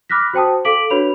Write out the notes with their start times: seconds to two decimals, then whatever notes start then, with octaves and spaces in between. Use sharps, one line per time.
0.09 B5 D6 F6 F#6 A#6 B6
0.33 F#4 C5 G5 A5 D#6
0.65 A4 F5 D6 B6 D7 F#7
0.90 D4 F#4 B4 C#5 B5 F7